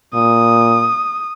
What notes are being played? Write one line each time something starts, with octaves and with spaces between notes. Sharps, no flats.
A#2 D#6